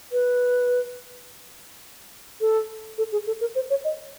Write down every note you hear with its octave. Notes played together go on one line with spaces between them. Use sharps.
B4
A4
A4
G#4
A4
A#4
C5
C#5
D#5